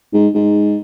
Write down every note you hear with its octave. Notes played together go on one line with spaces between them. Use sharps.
G#2
G#2